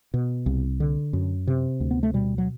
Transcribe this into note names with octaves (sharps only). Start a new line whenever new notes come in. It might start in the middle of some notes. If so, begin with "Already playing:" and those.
B2
C2
D3
F#2
C3
D2
B3
A3
B2 G3
F#3